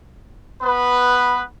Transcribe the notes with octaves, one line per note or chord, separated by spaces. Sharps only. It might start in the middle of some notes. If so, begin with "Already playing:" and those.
B3 B4